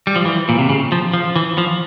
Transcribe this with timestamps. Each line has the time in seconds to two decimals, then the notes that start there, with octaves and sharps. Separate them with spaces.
0.07 G3
0.16 F3
0.25 E3
0.49 A#2
0.59 C3
0.69 C#3
0.92 F3
1.14 F3
1.36 E3
1.58 F3